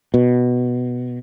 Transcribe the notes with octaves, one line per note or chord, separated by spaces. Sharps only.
B2